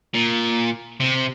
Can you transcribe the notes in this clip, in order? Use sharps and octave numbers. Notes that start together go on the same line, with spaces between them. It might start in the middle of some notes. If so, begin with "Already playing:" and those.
A#2
C3